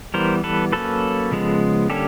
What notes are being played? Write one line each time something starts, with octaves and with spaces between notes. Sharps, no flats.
E3 G3 B3 A#4 C5
A4 B4
F#3 A#3 C#4 A4 B4
C#3 F3 G#3 B3
D3 G3 A#3 C#4 G4 A4